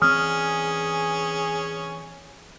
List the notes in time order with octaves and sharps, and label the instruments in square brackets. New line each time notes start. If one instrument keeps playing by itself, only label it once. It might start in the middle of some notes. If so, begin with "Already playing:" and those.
[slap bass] E3 C4 [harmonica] C#4 [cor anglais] G#4 [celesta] D#6 F6